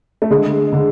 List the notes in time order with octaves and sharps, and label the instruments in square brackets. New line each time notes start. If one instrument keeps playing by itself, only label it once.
[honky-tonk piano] A3
[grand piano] D3 [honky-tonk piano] G#3
[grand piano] D3